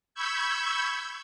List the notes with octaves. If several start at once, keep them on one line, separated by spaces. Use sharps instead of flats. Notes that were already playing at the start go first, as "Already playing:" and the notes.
B5 C#6 E6 G6 G#6